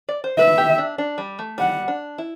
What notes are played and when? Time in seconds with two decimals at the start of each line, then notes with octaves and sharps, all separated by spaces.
0.09 D5
0.24 C5
0.38 B4 E5
0.58 G4
0.78 D4
0.98 D4
1.18 G3
1.39 A3
1.58 G3 F#5
1.88 D4
2.18 E4